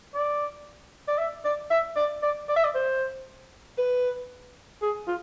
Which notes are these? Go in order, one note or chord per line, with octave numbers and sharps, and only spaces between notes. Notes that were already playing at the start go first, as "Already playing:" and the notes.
D5
D5
E5
D5
E5
D5
D5
D5
E5
D5
C5
B4
G#4
F4